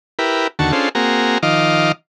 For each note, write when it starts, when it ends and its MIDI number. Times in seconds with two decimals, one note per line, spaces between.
0.19 0.47 64
0.19 0.47 67
0.19 0.47 70
0.19 0.47 71
0.59 0.72 39
0.59 0.72 50
0.59 0.72 66
0.59 0.72 81
0.59 0.72 85
0.72 0.89 61
0.72 0.89 62
0.72 0.89 65
0.72 0.89 68
0.72 0.89 69
0.72 0.89 72
0.95 1.38 58
0.95 1.38 60
0.95 1.38 66
0.95 1.38 68
0.95 1.38 82
1.43 1.92 51
1.43 1.92 53
1.43 1.92 75
1.43 1.92 77
1.43 1.92 86